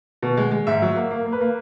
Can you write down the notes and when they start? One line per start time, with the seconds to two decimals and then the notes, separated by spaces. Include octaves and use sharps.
0.23 B2
0.37 G#3
0.51 G#3
0.67 G#2 E5
0.82 F#3
0.96 A#3
1.11 A#3
1.26 A#3
1.32 B4
1.41 A#3